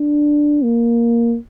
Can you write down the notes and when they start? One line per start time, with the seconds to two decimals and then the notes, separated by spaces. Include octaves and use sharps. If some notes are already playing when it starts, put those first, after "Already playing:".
Already playing: D4
0.64 A#3